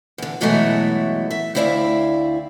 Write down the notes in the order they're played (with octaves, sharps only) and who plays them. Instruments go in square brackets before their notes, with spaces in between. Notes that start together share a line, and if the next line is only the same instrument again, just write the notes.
[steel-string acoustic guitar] E2 D3
G2 B2 E3 F#3 G#3 A3
E5
D2 C4 E4 D5 E5 F5